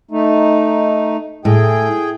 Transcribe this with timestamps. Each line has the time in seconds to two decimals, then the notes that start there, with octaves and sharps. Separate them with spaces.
0.11 A3 D#4
1.45 A2 G#4 G5